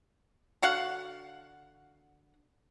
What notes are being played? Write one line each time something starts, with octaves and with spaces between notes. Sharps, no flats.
D3 F#4 F5 F#5